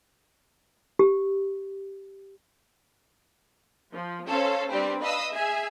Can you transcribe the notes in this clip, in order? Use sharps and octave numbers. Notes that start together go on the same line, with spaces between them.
G4
F3
C#4 A4 C5 C#5 F5
G3 C4 D4 G4 B4 C5
B4 D#5 F5 B5 D#6 E6
G#4 E5 G#5